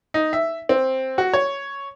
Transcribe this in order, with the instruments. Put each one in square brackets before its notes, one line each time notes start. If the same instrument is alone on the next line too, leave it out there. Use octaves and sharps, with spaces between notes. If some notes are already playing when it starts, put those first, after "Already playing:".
[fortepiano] D#4
E5
C4
F#4
C#5